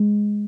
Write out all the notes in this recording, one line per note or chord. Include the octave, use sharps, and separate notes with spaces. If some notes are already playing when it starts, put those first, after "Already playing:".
Already playing: G#3